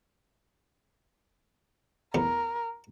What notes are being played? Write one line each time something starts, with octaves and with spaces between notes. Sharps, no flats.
E2 A2 B3 A#4